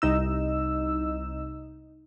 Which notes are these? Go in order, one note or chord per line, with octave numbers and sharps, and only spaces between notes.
C2 D#4 E6